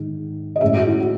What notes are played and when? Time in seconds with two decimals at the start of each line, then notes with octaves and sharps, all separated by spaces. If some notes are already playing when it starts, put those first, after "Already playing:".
Already playing: G#2 D#3
0.56 D#5
0.61 A2 G#3 C#4 E5
0.74 F#4
0.87 E4
1.00 F#4